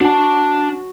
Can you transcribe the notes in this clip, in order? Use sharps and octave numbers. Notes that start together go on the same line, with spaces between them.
D4 F#4 A5